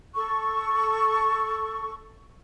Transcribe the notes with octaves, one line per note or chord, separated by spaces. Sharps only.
A4 C#6